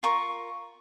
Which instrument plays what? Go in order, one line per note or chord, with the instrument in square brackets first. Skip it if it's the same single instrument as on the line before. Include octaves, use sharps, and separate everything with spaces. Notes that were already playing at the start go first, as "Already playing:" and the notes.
[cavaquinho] F4 A#4 C#6